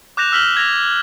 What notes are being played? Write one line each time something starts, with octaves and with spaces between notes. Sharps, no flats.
D6 F#6 G6 A#6 E7 F7
E6 F6 B6 F#7 G7
G#6 A#6 F7